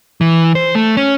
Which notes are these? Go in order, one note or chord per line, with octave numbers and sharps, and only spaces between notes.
E3
C5
A3
C#4